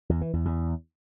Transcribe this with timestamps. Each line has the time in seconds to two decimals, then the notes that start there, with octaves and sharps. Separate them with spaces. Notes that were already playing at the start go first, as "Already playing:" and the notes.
0.09 E2
0.21 E3
0.33 E2
0.45 E2